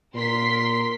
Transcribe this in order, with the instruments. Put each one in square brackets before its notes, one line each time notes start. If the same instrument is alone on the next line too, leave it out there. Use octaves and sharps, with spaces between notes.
[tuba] A#2 [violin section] A#4 C6 B6